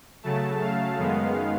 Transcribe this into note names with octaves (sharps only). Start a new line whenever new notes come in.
C#3 F#3 A3 A5
F5
F#2 D#3 G#3 B3